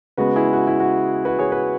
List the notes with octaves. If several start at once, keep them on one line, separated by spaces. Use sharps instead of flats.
C#3 G#3 B3 F#4 B4
E4 G#4
F#4
E4
F#4
F#4 B4
G#4 C#5
F#4 B4